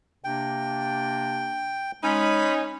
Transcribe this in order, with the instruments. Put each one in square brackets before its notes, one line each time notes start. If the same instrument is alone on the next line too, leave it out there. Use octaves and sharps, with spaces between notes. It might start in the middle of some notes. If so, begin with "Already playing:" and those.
[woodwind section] C3 A#3 D4 [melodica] G5
[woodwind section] G#3 [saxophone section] C#4 D#4 [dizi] B5